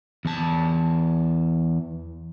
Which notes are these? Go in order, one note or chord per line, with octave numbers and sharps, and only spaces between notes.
E2 A5